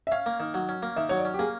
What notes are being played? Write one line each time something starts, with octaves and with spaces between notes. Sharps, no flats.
E5
C#4 F5
A#3
D#3
F#3
C#4
A#3
D#3 E5
F#3 C#5
D5
C#4
G4
A#3 G#4